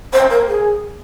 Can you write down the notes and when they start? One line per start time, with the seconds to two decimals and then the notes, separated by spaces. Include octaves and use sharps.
0.13 C5
0.30 A#4
0.48 G#4